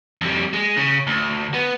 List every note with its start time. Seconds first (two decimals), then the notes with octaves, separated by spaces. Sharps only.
0.21 F2 G3
0.54 G#3
0.77 C#3
1.07 D2
1.54 B3